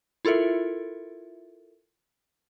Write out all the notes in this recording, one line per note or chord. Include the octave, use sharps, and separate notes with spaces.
E4 F4 A4 A#4 E5